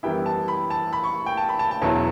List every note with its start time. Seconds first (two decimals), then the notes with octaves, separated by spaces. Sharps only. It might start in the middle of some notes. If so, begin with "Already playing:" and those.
0.03 F#2 E3 G3 B3 E4 G5
0.26 A5
0.48 B5
0.70 A5
0.93 B5
1.04 C#6
1.26 G5
1.37 A5
1.49 B5
1.59 A5
1.71 A5
1.82 E2 B2 F#3 C#4 E4 A5